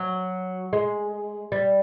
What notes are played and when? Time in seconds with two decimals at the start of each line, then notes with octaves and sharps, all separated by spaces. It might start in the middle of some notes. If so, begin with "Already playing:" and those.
Already playing: F#3
0.73 G#3
1.52 G3